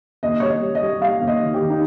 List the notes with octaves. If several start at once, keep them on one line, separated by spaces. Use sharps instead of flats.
D#2 D#5
G3 C#5
D#5
G3
D#5
G3
G3 F5
D#2
D#5
D#3
G4
D#3
D#4